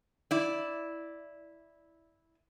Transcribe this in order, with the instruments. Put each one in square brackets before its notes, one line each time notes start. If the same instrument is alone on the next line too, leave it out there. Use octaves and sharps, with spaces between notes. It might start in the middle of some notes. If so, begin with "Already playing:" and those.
[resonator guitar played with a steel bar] E4 D5